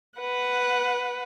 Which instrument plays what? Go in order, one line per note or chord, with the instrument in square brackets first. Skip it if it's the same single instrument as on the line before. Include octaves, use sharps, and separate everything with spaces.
[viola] B4 F#5